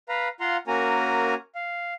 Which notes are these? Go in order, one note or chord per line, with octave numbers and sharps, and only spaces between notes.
B4 F5 A#5
F4 F5 F#5 A#5 C6
A#3 C#4 F#4 A#4 G#5 A#5
F5